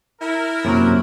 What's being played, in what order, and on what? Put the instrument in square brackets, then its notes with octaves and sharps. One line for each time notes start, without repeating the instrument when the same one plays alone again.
[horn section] E4 A#4
[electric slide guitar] F#2 C3 F#3 [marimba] A#3